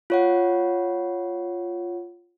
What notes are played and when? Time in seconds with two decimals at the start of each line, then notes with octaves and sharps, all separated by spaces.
0.10 F4 C#5 F#5